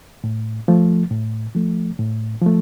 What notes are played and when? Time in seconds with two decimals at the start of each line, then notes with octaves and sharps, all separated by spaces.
0.24 A2
0.68 F3 A3
1.11 A2
1.55 F3 A3
1.99 A2
2.42 F3 A3